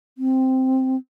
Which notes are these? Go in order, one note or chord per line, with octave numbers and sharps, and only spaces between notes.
C4